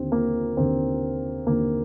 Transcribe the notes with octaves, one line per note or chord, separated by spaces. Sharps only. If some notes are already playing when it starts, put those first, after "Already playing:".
Already playing: D#2 D3 C4
A#3
D#2 D3 C4
D#2 D3 A#3